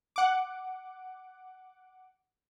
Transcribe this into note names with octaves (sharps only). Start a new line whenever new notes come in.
F#5 D6